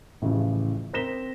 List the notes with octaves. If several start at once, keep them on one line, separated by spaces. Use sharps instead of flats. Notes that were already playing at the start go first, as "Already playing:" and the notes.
A1 A2 C#3 F3
C4 A#4 A#6 B6 E7 G7